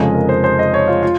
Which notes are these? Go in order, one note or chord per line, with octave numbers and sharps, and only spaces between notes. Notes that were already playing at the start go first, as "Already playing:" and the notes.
Already playing: F1 F2 C#3 F3 G#3 D#5
A#4
C5
C5
D#5
C#5
F4
F4